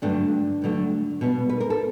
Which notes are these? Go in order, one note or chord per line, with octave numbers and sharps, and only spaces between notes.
G2 D3 F#3 A3 D4
G2 D3 F#3 A3
B2 G3 B3
B4
A#4
A4